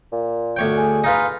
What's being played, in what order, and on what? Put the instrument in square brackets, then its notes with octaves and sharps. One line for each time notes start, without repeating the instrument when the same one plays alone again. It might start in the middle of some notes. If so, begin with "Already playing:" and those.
[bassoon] A#2
[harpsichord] D2 C#5 G5
[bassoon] G#4
[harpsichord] D#4 F4 B4